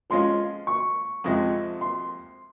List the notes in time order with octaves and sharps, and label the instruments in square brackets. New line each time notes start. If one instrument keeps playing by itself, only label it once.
[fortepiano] F3 G#3 C#4 F4 [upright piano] C6
[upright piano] C#6
[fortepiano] F2 C3 F3 G#3 C4
[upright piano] C6